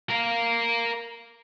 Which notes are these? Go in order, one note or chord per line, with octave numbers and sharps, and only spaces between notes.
A#4 F5